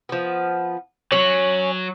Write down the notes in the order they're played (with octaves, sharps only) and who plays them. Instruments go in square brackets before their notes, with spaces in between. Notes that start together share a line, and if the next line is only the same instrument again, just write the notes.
[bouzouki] F3 B3
[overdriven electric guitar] F#3 [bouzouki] C#4